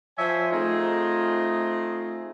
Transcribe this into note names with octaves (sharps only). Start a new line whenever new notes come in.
F3 C5 C#5 E5 G#5
A3 C4 D#4 F4 G#4